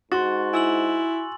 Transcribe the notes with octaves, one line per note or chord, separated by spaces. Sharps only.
G#2 F#4 C6 C#6 A6
E4 G#5 E6 F#7